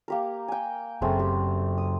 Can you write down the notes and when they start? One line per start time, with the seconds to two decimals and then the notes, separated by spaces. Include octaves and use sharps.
0.08 A#3 G4 A#4
0.48 G5 G#5
1.02 F#1 F#2 C#3 A3 C4 G#4
1.19 G4
1.78 D#6